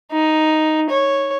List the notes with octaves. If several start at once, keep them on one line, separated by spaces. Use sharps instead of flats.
D#4
C#5